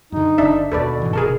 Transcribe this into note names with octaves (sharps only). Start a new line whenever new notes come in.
F#2 D3 D#4
F#1 D3 D4 E5
D#2 B2 D#3 A4 B4 D5
G#2 E3
F#1 C3 D#3 G#4 A#4 A5